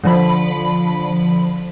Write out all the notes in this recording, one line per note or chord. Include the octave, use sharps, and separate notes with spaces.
D3 F3 B5